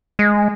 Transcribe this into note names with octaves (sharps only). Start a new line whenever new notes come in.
G#3